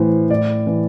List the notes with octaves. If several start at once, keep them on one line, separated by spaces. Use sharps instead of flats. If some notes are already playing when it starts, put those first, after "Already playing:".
Already playing: A2 E3 C5
A2 D5
E3